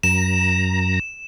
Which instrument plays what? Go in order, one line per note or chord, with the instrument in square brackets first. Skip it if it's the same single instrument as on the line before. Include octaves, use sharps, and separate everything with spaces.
[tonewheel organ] F#2 A#5 [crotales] E7